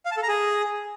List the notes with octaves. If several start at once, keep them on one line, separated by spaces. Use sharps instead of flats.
F5
A5
A4
A#5
G#4